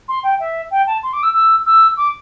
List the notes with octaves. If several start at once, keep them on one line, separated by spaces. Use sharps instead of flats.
C6
G5
E5
G5
A5
C6
D6
E6
E6
E6
D6